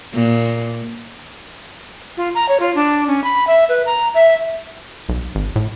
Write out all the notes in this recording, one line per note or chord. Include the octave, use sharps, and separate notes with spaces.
A#2
F4
A#5
C#5
F4
D4
C#4
B5
E5
B4
A#5
E5
B1
G#1
A2